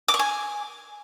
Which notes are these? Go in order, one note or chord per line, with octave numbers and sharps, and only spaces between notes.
D6
C#6
G#5